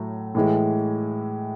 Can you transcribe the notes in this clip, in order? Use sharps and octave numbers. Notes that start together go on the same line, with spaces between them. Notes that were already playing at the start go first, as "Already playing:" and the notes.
Already playing: A2 F#3 A3
A2 E3 G#3